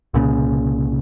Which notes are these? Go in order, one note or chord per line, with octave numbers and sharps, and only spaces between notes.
C2 A#2 C#3